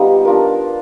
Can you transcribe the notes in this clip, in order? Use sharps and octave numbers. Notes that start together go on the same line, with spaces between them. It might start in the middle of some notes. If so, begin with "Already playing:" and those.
Already playing: G3 B3 D#4 F4
D4 F4 A#4